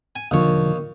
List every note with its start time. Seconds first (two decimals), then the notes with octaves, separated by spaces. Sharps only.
0.16 G#5
0.31 E1 D#2 D3 F3 C#5